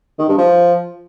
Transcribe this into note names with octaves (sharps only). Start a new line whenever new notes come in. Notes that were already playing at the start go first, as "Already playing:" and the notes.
D#3
G2
F3